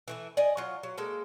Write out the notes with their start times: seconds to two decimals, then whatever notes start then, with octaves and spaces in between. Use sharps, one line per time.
0.08 E3 A3 E4
0.37 D5 D#5 G#5
0.57 F#3 F4
0.83 F#3
0.98 G#3 A#3 A4